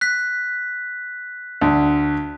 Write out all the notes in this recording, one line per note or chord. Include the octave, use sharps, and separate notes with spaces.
F#6 B6
D2